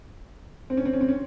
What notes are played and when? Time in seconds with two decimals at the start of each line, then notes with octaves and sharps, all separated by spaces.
0.70 C4
0.77 C#4
0.85 C4
0.93 C#4
1.01 C4
1.08 C#4